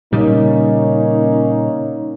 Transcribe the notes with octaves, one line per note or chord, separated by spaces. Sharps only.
A#2 C#3 G3 A#3 C#4 D#4